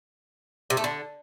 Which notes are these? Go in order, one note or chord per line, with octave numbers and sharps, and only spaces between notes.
C3
A3
D3